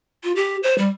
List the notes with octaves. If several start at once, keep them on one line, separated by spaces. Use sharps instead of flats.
F4
G4
C5
G3